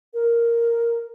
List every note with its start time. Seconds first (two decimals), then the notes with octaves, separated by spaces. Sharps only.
0.14 A#4